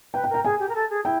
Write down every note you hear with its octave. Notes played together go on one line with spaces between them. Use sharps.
B4 G5
G5
A#4
G5
G#4 G#5
G4
A#4
A4
G#4
E4 G5